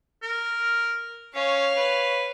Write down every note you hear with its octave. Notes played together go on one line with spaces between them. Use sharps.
A#4
C#4 C#5 F5
B4